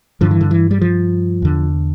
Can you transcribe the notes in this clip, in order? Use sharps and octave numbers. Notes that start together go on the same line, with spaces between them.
G2 D3 F3
E3
D3
E3
G3
F3
E2 D3